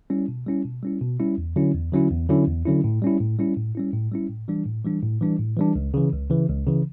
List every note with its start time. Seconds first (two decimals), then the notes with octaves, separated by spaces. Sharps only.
0.10 G3 C#4 E4
0.28 B2
0.47 G3 C#4 E4
0.65 B2
0.83 G3 C#4 E4
1.01 B2
1.19 G3 C#4 E4
1.38 E2
1.56 D3 F#3 C#4 E4
1.74 E2
1.92 D3 F#3 C#4 E4
2.11 E2
2.29 D3 F#3 C#4 E4
2.47 E2
2.65 D3 F#3 C#4 E4
2.84 A2
3.02 G3 C#4 E4
3.21 A2
3.38 G3 C#4 E4
3.57 A2
3.75 G3 C#4 E4
3.93 A2
4.12 G3 C#4 E4
4.29 A2
4.48 E3 G3 D4
4.66 A2
4.84 E3 G3 D4
5.03 A2
5.21 E3 G3 D4
5.39 A2
5.57 E3 G3 D4
5.75 C#2
5.94 C#3 E3
6.12 C#2
6.30 C#3 E3
6.49 C#2
6.67 C#3 E3